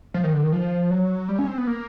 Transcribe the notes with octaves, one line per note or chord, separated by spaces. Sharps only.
F3
D#3
D3
D#3
F3
F#3
G3
C#4
C4
B3
A#3